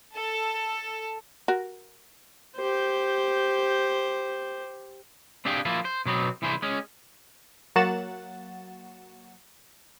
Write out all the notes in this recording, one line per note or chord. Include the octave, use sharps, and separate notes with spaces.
A4
F#4 A#4
G4 C5
C4 D4 G4 G#4 F5 G5
F3 A#3 E4 F4
C5
B2 F#3 B3 C4
C2 E3 E4 G#4 C5
G#3 C#4
F#3 A#3 F#4 F#5 A6 E7